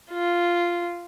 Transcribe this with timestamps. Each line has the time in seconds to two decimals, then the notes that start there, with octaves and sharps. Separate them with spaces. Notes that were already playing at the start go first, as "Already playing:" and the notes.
0.11 F4